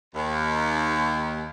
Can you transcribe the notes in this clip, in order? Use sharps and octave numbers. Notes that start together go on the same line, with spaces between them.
D#2